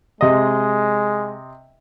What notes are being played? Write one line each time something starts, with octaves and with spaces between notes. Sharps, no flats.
C3 G#3 D#5